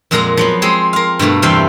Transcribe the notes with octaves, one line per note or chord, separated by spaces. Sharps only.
F2 A#2 G#3 A#4 F#5 A#5
F3 F#3 B3
G#3 C4 G#4
A#4 F5
G2 B2 A3 A#3
E2 C3 G3 C5 F5 G5